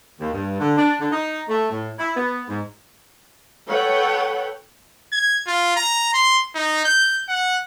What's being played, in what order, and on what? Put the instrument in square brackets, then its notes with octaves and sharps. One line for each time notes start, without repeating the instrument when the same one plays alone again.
[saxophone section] D#2
G2
D3
D4
D3
D#4
A3
A2
E4
B3
G#2
[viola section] A4 B4 C#5 F#5 G5
[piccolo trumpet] G#6
F4
A#5
C6
D#4
G6
F#5